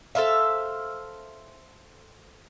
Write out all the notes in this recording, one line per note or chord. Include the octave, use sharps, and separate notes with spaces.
A4 C5 E5 F5